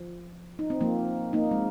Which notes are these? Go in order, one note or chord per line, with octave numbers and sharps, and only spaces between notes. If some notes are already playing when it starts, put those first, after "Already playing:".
Already playing: F3
D#4
C4
F3 A#3
A#3 D#4
G#3 C4